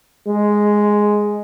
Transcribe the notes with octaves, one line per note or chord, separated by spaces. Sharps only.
G#3